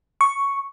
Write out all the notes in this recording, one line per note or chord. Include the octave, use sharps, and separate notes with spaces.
C#6